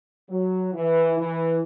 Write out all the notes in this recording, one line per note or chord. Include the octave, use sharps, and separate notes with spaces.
F#3
E3
E3